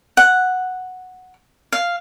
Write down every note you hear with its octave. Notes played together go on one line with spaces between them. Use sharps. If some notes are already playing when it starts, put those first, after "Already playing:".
F#5
F5